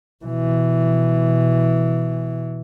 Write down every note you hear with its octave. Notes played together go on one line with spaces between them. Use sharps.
B2 E3